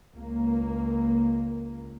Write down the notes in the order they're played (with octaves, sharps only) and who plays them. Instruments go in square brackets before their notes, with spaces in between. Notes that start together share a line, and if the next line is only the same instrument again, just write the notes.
[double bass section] C#2 A#3